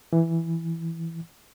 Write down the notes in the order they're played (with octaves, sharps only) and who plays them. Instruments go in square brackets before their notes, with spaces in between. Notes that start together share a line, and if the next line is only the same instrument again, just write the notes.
[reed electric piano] E3